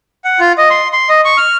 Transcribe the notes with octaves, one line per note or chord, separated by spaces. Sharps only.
F#5
F4
D#5
C6
C6
D#5
C#6
F6